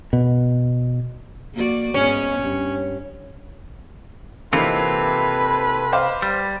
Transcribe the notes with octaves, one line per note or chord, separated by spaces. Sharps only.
B2
A#3 F#4 D5
G#2 B3 C#4
G2
C3 E3 A#3 C4 D#4 F4 A4 B4
C5 F5 D6
G3